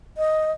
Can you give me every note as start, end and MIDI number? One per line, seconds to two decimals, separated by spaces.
0.17 0.52 75